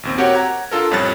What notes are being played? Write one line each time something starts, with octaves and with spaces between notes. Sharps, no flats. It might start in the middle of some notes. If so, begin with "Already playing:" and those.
A#1 D#2 C4
C4 F#4 G4 A#4 C#5 F#5
F#5 A#5 G#6
D4 F4 A4 A#4
A1 F2 G3 C#5 F#6 A6